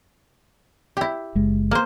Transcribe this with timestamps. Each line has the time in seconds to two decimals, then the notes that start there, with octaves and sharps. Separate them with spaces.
0.97 E4 G4
1.35 F#1 G#3
1.71 A#3 C5